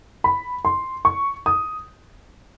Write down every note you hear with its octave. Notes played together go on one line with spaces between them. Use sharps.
B5
C6
C#6
D#6